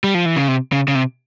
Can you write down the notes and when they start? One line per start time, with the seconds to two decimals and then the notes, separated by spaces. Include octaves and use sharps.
0.04 G3
0.15 F3
0.25 E3
0.36 C#3
0.48 C3
0.72 C#3
0.88 C#3
0.95 C3